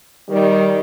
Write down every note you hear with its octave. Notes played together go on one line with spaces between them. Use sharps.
D#3 G3